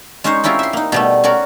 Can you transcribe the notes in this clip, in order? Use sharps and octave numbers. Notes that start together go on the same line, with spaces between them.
G#3 C#4 D#4 C5 C#5
C4 C#4 E4 F4 G4 A#4
E5 C6
A#3 D#4
B2 G3 A3
C#4 F#4 A#4 D5